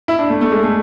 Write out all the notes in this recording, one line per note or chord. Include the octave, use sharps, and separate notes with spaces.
E4
D4
A3
A3
G#3
A3